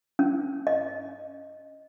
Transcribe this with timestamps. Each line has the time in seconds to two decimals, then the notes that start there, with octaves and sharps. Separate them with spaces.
0.19 C#4
0.67 D#5